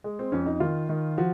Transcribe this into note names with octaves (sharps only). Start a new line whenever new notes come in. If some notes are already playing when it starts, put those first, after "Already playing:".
G#3
C4
F2 C#4
D#4
D#3 F4
D#3
F3 F#4